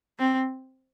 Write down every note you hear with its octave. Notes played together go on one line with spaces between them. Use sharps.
C4